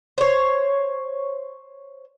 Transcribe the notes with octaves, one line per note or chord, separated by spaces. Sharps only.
C5 C#5